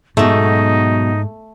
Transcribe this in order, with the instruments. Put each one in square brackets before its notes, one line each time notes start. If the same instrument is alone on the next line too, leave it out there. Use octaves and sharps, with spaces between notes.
[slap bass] G#2 [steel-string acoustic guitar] B2 F#3 [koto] A3 [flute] D#4